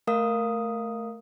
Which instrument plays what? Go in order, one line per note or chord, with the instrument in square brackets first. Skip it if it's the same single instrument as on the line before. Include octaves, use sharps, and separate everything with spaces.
[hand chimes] A3 A#4 F5 D#6